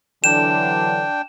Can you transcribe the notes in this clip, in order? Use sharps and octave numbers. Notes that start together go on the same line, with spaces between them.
D3 E3 F#3 D4 G5 E7